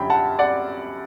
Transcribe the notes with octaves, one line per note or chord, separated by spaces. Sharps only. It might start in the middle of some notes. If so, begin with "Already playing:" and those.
Already playing: F#2 D3 G3 C#4 G5 B5
F#5 A5
D5 F#5